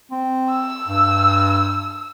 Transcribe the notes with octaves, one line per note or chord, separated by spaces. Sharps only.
C4
E6
G2